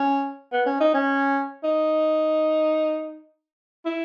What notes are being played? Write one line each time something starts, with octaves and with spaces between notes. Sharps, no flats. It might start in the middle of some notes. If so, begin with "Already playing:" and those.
Already playing: C#4
B3
C#4
D#4
C#4
D#4
E4